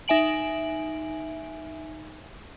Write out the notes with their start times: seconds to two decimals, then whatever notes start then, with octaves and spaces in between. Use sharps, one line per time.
0.08 D#4 E5 G#5 D7 F#7